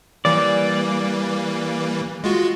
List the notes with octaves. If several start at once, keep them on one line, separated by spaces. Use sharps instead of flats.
E3 G3 A#3 D5
G#3 F4 F#4